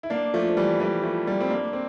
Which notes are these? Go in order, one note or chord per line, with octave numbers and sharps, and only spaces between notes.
E4
A#3 D4
F3 A3
F3
E3 G3
E3 G3
F3 A3
G3 A#3
C4
A#3 D4
C4